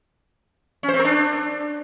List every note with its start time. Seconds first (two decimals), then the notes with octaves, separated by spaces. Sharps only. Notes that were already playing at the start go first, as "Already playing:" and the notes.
0.83 C#4
0.89 C5
0.94 C4
0.99 A#4
1.05 D4